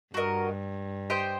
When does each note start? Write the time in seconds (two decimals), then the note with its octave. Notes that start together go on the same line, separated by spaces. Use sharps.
0.14 G2 F#4 A#4 D#5
1.10 G4 C5 D#5 G5